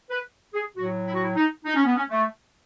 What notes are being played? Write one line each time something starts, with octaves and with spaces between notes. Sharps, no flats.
B4
G#4
A2 F#3 F#4
E4
F#4
E4
D#4
D#4
C#4
B3
C#4
A3